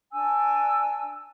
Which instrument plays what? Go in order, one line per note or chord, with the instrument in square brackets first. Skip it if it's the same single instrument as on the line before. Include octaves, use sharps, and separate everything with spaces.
[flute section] D4 G#5 E6